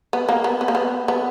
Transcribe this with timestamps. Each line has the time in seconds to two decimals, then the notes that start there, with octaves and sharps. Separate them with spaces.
0.13 B3
0.29 A#3
0.44 B3
0.61 B3
0.68 A#3
0.75 B3
1.08 B3